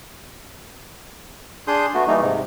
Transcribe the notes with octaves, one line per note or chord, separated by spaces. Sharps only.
D4 G#4 C6 D#6 G6
A3 B3 F#4
E3 G3 A3 A#3 D#4
G#2 C3